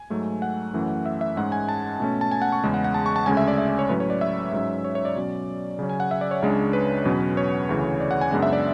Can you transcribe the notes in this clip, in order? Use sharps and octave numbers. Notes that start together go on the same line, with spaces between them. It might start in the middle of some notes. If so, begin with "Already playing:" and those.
Already playing: G#5
G#2 F#3 A3
F#5
F#2 E3 A3 C#4
E5
E5
G#2 G#3 C#4 F#5
G#5
A5
B2 A3 C#4
A5
G#5
F#5
C#6
E2 C#3 G#3
F#5
F#5
A5
C#6
A5
D2 C#3 G#3 C#4 G#5
E5
D5
E5
D5
C#5
A2 F#3 C#4 B4
C#5
D5
E5
G#2 F#3 C#4
C#5
C#5
D5
B2 F#3 C#4
C#3 F#3 C#4
G#5
F#5
E5
D5
C#5
C#2 C#3 G#3 D4
B4
E2 B2 F#3 C#4
C#5
D2 C#3 E3
D5
F#5
G#5
F#2 C#3 G#3 B3 D4 F#5
E5
D5